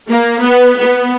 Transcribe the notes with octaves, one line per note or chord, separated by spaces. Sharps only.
A#3
B3
B3